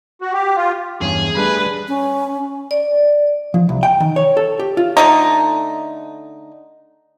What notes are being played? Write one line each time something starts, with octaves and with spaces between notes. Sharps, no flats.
F#4
G4
F4
E2 G2 C#4 G#4
G3 A3 D4 B4
C#4
D5
F3
C2
G5
D#3
C#5
A4
G4
F4
D3 A3 D#4